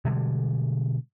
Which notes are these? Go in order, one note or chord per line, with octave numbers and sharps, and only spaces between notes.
B2 D3 G3 G#3